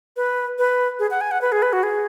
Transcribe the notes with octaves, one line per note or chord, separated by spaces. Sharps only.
B4
B4
G#4
F#5
G#5
F#5
B4
G#4
B4
F#4
G#4